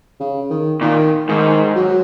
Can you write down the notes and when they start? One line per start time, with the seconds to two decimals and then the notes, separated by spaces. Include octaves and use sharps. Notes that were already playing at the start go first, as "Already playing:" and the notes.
0.20 C#3
0.50 D#3
0.81 A#2 D#3
1.29 G#2 D#3
1.75 F#3